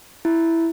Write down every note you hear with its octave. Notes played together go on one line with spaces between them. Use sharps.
E4